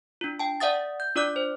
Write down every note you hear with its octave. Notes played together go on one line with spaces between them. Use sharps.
D4 F4
G5 A5
D5 E5 F#5 D#6 A6
G6
D4 F4 D5 D6 F#6
C5